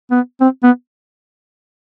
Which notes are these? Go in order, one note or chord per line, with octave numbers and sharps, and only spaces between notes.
B3
C4
B3